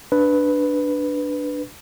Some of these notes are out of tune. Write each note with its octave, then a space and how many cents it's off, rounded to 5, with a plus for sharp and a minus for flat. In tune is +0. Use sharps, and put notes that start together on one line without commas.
D4 +0 B4 +0